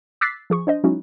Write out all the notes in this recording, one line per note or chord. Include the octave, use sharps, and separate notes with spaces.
D6 E6 F#6 A6 B6 C7
F3 G#4 C#6
D4 C5 D#5
F#3 G#3 C#4 D#4 E4 F#4